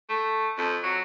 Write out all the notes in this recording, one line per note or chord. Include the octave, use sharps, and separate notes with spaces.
A3
F2
F#3